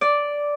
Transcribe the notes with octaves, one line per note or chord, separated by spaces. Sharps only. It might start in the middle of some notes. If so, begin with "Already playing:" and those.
D5